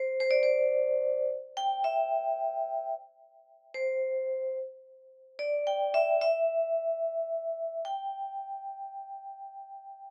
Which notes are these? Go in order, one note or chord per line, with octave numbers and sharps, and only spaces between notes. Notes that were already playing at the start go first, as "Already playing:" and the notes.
Already playing: C5
C5
D5
C5
G5
E5
C5
D5
G5
E5
E5
G5